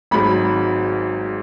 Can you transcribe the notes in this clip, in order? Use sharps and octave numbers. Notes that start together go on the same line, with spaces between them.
G#1 G#2 F#3 B5